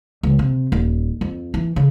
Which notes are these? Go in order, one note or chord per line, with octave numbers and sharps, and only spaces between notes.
C#2
C3
D#1
F2
E3
C#3